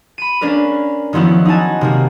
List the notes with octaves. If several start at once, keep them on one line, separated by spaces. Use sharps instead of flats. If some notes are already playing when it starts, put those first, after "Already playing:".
B5 D#7
A#3 C#4 D4 A#4 B4
D#3 F3 F#3 B3 E4
D#4 F#5 G#5 A5
C3 D#3 A#3